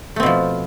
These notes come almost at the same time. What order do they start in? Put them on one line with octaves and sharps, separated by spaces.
A3 C4 B2 F3